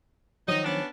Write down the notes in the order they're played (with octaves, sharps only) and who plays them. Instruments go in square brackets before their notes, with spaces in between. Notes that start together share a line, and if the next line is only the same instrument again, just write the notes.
[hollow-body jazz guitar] D#3 F3 F#3 [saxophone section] D#4 D#5
[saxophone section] B3 C#4 D4